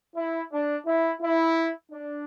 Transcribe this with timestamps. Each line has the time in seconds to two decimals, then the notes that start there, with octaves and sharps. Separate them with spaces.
0.15 E4
0.51 D4
0.85 E4
1.21 E4
1.91 D4